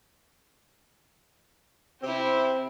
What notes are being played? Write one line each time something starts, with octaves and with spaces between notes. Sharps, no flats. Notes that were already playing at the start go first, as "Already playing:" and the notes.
C3 C4 E4 G4